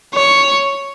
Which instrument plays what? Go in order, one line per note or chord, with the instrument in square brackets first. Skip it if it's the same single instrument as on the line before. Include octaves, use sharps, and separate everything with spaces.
[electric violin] C#5